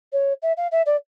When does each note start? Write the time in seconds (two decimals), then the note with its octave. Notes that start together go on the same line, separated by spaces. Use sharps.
0.12 C#5
0.42 E5
0.57 F5
0.71 E5
0.86 D5